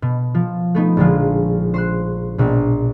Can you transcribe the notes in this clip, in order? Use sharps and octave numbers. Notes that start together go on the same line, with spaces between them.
B2
F3
A3 B3 D#4
A#1 D3 F3 G#3 F4
C5 C6 F#6
A#1 B2